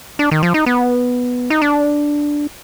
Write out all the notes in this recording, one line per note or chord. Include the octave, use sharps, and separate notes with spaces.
D4
D#3
F3
D#4
B3
D#4
D4